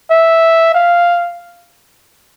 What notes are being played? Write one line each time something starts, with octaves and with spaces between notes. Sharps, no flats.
E5
F5